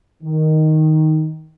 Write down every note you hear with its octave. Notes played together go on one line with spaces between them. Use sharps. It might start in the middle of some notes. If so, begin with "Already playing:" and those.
D#3